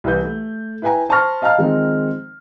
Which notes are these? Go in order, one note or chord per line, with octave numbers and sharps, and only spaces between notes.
C2 E3 B4 G6
A3
E4 B4 G5 G#5 A#5
C5 A5 B5 C#6 F6 A#6
D#5 F5 A5 A#5 F6
D#3 F3 G#3 C4 D#4